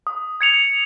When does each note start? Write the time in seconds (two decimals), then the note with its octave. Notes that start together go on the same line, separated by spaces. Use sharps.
0.07 D#6
0.41 G#6 C#7 F7